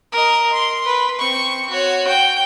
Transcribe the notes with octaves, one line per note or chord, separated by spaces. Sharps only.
A#4 D#5
C6
B4
C4 C#6
F#4 C#5
G5